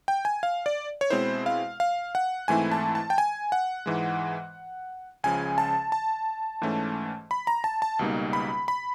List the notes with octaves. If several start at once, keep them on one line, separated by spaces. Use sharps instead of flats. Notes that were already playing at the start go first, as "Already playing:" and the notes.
G5
G#5
F5
D5
C#5
B2 G#3 C4 E4 C5
F5
F5
F#5
G#2 E3 A3 C4 E4 G#5
A5
A5
G5
G#5
F#5
G#2 E3 G#3
C#2 C#3 F3 G#5
A5
A5
G#2 E3 A3 C#4
B5
A#5
A5
A5
C#2 B2 G3 A#3 D#4
B5
B5